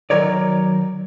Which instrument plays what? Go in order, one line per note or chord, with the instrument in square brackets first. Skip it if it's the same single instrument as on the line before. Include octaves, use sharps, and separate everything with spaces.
[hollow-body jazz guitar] D#3 E3 F#3 A#4 C#5 D5